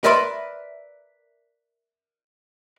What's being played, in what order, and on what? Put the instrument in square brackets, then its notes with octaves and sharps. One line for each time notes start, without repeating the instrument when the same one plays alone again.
[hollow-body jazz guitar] A#4 B4 D5 E5 B5 C6